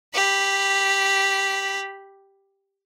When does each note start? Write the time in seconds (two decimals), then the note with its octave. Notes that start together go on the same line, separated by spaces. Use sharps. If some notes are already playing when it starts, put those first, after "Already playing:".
0.14 G4 B5